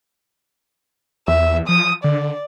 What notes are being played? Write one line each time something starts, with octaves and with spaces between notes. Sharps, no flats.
E2 E5
F3 D#6
D3 D5